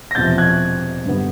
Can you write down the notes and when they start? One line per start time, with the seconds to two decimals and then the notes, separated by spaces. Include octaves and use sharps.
0.11 A#6
0.15 E1 E2 C3 F3 G6 A6
0.38 F#6 G#6
1.06 G2 D3 G3 B3